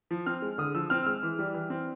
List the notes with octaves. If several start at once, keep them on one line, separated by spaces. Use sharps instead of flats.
F3
C4 F6
G#3
D3 D#6
F3 E6
C4 F6
E6
G#3 F6
E3
G3
E3
C4